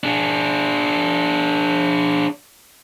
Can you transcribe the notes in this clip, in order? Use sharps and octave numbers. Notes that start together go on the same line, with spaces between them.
D4 G#4